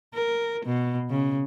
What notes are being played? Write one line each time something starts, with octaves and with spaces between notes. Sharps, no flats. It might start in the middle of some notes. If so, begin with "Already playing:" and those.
A#4
B2
C#3